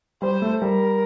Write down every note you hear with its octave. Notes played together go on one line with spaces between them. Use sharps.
G3 C5
A3
G3 A#4